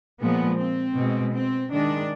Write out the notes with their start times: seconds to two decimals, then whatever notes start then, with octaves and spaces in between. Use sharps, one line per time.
0.21 A#2 F3 G#3 B3
0.59 C4
0.96 B2 G#3
1.34 C4
1.71 D#3 G#3 D4